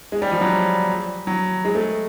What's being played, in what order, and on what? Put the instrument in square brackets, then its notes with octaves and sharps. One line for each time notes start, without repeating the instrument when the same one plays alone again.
[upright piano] G#3
G3
F3
F#3
F#3
G#3
A3